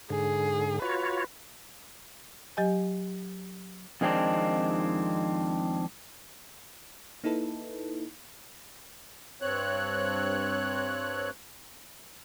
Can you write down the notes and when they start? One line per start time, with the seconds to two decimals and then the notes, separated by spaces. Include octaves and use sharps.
0.10 G#2 D3 G#4
0.82 F4 F#4 B4 C#5
2.57 F#3 G4 D#5 G#5
4.01 F2 D#3 G#3 C4 D4 D#4
7.24 A#3 D#4 E4 A4 B4
9.42 G2 C4 C#5 F#6